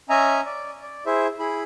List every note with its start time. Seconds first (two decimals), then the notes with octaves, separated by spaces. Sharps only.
0.10 C#4 D#5 E5 G#5 A#5
0.45 D5
0.82 D5
1.06 E4 G#4 C5 E5
1.39 E4 G#4 B5